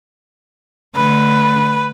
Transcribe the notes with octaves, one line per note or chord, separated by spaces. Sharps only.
D3 A3 B4